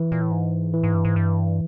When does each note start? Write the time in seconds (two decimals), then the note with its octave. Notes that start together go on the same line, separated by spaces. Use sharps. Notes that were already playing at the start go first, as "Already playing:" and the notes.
Already playing: E3
0.12 A#2
0.22 A2
0.31 G#2
0.73 A2 E3
0.84 G#2
0.94 G2
1.05 G#2
1.16 G2